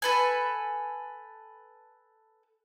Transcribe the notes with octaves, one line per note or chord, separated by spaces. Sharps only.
A4 B4 G#5